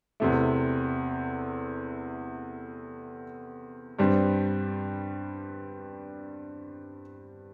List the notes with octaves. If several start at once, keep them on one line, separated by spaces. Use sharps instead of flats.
E2 C3 A3
G2 G3 C4